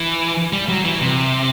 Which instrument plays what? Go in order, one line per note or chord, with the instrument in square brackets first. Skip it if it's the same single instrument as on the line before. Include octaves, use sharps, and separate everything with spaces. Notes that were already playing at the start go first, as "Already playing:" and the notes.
Already playing: [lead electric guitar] E3
G3
F#3
E3
C3